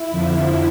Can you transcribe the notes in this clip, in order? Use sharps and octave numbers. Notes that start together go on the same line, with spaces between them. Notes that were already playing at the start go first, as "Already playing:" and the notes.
Already playing: E4
F2 D3 F3